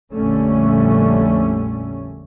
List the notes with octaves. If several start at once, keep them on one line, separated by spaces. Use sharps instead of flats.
A#1 F2 D3 G3 A3 C#4